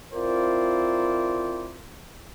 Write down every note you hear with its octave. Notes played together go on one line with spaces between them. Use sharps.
C4 E4 F4 A#4 C5 D5